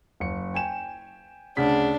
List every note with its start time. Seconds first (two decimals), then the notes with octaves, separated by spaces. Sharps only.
0.20 F#1 C#7
0.54 G5 G#5 E7
1.57 D2 C#3 D4 B6